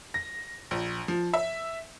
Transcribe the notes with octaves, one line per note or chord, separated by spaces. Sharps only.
A#6
A#1
F3
E5